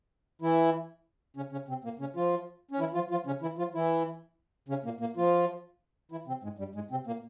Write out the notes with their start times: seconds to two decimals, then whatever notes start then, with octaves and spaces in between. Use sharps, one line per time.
0.42 E3 E4
1.36 C#3 C#4
1.52 C#3 C#4
1.68 C3 C4
1.84 A#2 A#3
1.99 C#3 C#4
2.16 F3 F4
2.71 C#4
2.79 E3 E4
2.94 F3 F4
3.11 F3 F4
3.26 C#3 C#4
3.42 E3 E4
3.58 F3 F4
3.74 E3 E4
4.68 C#3 C#4
4.84 A#2 A#3
5.00 A#2 A#3
5.17 F3 F4
6.11 E3 E4
6.27 C3 C4
6.43 G#2 G#3
6.58 G2 G3
6.75 G#2 G#3
6.91 C3 C4
7.07 A#2 A#3